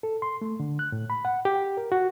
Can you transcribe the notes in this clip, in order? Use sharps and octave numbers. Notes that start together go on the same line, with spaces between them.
A4
C6
A3
D3
F#6
A2
B5
F#5
G4
A#4
F#4